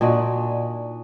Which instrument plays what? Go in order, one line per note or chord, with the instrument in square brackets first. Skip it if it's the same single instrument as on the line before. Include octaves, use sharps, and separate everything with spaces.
[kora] A#2 D4 D#4 F#4